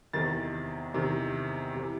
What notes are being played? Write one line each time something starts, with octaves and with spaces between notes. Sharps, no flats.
E2 C3 D#3 A6
E2 C3 D#3
C3 E3